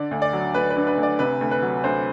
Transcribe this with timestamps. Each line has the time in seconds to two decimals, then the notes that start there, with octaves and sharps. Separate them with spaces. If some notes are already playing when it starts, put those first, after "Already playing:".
Already playing: D3 D5
0.11 D2
0.22 D5
0.33 F#3
0.54 D2 B4
0.70 B4
0.76 D3
0.87 B4
0.98 D2
1.03 D5
1.19 C3 B4
1.41 D2
1.51 B4
1.62 F#3
1.84 D2 C5